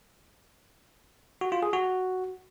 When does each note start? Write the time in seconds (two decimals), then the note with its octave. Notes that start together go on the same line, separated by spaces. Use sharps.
1.41 F#4
1.52 F4
1.63 G#4
1.73 F#4